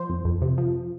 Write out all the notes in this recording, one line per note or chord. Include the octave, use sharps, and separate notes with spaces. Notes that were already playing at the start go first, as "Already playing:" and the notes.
Already playing: F3 C5
F2
F2
C3
F3